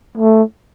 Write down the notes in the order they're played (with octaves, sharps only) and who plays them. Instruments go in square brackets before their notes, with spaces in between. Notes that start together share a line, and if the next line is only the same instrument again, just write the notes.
[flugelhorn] A3